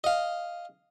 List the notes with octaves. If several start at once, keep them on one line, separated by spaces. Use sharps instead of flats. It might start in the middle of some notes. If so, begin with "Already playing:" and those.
D#5 F5